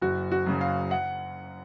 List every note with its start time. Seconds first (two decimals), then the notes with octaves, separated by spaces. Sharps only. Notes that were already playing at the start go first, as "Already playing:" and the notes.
0.01 F#1 F#4
0.32 F#4
0.46 F#2 C#3 F#3
0.61 F5
0.91 F#5